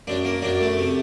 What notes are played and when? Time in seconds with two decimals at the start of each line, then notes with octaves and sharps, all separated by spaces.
0.07 F#2 D4
0.25 A#3
0.42 F#2 D4
0.61 A3
0.79 C3